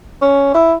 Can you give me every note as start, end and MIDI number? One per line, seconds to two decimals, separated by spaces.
0.22 0.52 61
0.54 0.74 64